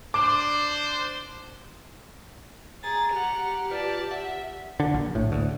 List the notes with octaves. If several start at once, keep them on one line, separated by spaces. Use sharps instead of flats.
D4 C5 D6
G#4 A#5 A6
G4 F#5 F7
F4 B4 D5 A5
E5 F#5
D3
A#1
A2
D2